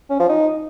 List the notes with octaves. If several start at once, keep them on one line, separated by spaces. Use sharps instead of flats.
C#4
F3
D#4